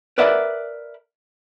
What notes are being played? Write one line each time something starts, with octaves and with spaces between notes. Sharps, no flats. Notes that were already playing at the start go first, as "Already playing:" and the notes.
A#4 B4 D5 E5 F#5